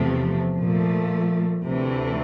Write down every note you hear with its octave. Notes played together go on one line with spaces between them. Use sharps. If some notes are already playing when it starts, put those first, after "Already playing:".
Already playing: E2 C3 F3 A3
A#2 F3 A3
D2 C3 E3 A3